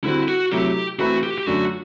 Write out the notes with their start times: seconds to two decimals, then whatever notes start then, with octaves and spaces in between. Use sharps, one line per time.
0.04 D3 G3 C4 E4 F#4
0.28 F#4
0.52 C3 F#3 A3 E4 G4
0.99 E3 A3 C4 E4 F#4 B4
1.23 G4
1.38 G4
1.46 F#2 D3 A3 D4 F#4 A4